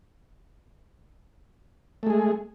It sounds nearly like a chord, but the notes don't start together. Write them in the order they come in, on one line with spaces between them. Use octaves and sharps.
A3 G#3 G#4